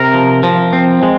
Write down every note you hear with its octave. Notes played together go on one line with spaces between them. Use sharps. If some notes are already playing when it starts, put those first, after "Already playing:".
Already playing: C3 A#4
F3
F3
C4
G#3